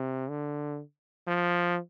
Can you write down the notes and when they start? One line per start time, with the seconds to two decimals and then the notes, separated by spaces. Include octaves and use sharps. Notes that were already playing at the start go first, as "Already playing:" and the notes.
Already playing: C3
0.29 D3
1.27 F3